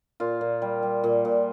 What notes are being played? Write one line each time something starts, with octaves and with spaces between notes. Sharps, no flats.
A#2 F4
A#2
G3
G3
A#2
A#2